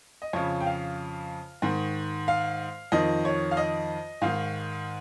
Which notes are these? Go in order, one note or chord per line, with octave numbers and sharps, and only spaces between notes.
D#5
F2 C#3 C#5
G5
F5
G#2 D#3
F5
F2 D#3 D#5
C#5
F5
D#5
G#2 D#3 F5